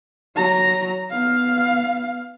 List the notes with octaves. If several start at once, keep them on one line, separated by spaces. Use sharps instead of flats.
F#3 A#5
B3 F5